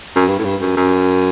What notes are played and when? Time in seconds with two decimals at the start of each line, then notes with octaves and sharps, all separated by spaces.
0.16 F#2
0.28 G2
0.39 A2
0.44 G2
0.61 F#2
0.77 F#2